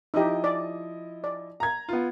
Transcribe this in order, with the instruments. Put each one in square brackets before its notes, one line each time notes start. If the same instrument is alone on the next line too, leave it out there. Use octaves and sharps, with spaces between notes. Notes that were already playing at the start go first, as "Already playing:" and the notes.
[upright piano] F3 E4 D#5 [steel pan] D#4 G4
[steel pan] D5
D5
[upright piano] A#5 G#6
B3 F4